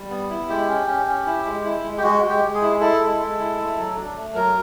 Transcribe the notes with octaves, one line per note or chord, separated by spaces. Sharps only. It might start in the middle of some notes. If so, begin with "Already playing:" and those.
Already playing: G3
B3
E4
G#3 G4
C#4
C#4
C#4
E4
G#3
E4
G#3
G4
G#3 F#4
G#3
G4
G#3
G#4
E4
E4 A4
G#3
G#3
E4
A3
F#3
D4
A3
F#3 A#4